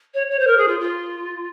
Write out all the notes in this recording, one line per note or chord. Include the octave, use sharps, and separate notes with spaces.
C#5
C#5
C5
A#4
G#4
F4
F4